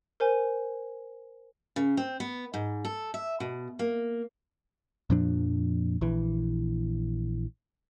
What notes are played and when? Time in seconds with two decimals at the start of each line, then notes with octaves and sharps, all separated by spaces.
0.20 A#4 C5 G#5
1.76 C#3
1.97 C4
2.20 B3
2.54 G#2
2.85 A4
3.14 E5
3.40 B2
3.79 A#3
5.10 F2 A#2 F3 D4
6.01 A#1 E3